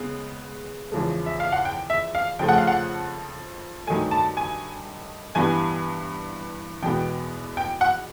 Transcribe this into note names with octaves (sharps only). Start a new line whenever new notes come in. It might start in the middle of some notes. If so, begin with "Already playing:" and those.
Already playing: C#3 G#3 B3
E2 C#3 F3 G#3
E5
F5
F#5
G5
E5
F5
F2 C#3 F3 A3 G5
F#5
F5
F#5
G2 D#3 F#3 A3 G#5
A5
G#5
G2 E3 G3 B3 G#5
E2 B2 G#3 B3 G5
G5
F#5